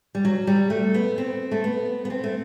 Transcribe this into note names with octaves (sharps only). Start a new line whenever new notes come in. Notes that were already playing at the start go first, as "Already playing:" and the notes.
G3
F#3
G3
A3
B3
C4
A3
B3
B3
C4
A3